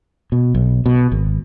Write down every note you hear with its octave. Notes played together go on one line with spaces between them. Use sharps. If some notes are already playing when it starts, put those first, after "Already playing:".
B2
B1
B2
G#1